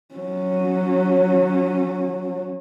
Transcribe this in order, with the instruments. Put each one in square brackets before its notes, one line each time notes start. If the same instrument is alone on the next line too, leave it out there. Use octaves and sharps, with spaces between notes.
[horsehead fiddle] F#3 C#4